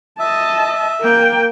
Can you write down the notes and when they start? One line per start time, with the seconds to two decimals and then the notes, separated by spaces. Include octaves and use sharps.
0.19 D#5 E5 A5
1.01 A#3 G5